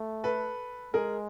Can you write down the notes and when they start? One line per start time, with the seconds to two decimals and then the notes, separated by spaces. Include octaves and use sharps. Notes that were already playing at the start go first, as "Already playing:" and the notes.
Already playing: A3
0.24 A4 B4
0.94 G#3 G#4 A#4